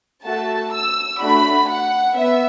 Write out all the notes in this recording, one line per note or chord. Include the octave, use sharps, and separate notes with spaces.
A3 F#4 A4 A5
E6
A3 D4 F#4 B5
F#5
B3 E5